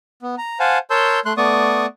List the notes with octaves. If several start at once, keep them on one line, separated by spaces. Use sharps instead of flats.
B3
A#5
C5 F5 F#5 G#5 A5
A#4 C#5 A5 C6 E6 G6
A3 C6 F#6
A3 B3 D5 C#6 D#6